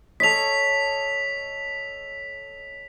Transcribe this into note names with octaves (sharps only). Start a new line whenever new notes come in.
A4 C#5 D#5 B6 F7